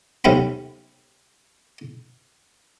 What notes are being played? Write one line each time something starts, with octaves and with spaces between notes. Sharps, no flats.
B1 C3 C#4 G5 B5